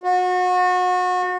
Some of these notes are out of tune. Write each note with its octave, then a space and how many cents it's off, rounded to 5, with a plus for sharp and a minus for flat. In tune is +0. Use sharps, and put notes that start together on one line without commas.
F#4 -30